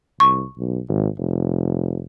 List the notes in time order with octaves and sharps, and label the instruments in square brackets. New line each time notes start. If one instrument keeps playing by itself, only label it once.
[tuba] C2 [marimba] C#6
[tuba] B1
G#1
F1